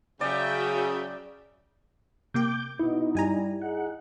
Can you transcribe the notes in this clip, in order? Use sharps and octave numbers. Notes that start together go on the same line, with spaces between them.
C#3 F#3 D5 E5 G5
C3 A#3 G5 D6 G6
B2 D#4 E4
G2 G3 G#5 A#5
D#4 G#4 F#5